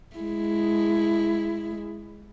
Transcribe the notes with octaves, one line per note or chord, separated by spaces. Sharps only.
G#3 E4